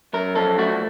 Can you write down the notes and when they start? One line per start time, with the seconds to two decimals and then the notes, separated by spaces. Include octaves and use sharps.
0.13 F#2 A#4
0.36 F3 A4
0.58 A3 F#4